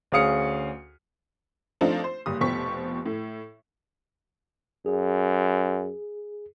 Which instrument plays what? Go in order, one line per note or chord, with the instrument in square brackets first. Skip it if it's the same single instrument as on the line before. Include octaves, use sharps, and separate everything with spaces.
[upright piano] D2 C#4 G#4 F5 D#6 C#7
[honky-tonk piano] F3 A3 C4 D4 D#4 F4
C5
F#1 G2 D#6
F1 B2 F3 G4 C#6 B6
A2
[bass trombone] F#2 [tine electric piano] G#4